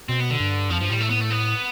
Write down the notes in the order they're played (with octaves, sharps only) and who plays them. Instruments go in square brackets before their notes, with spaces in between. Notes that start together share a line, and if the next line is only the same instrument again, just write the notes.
[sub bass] B2 [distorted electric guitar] C4
[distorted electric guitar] B3
D3
[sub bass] G2
[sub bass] F2 [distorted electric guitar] F3
[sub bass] G2 [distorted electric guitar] F3
[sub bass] A2 [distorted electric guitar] G3
[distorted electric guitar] A3
B3
A3
B3